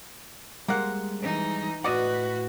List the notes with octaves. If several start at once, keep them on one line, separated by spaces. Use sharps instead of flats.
G3 G#3 A#3 C5 F#5
E3 D#4
A2 F#4 B4 D5 D#5 F#5